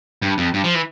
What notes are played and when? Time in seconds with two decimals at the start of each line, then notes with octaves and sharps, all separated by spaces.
0.22 G2
0.38 F2
0.54 G2
0.64 F3
0.75 E3